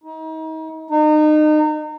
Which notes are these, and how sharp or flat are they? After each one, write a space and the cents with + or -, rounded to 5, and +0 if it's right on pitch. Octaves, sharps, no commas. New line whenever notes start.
D#4 +35
D#4 -30